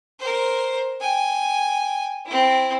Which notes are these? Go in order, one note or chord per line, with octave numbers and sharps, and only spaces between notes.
A#4 C5
G5 G#5
C4 E4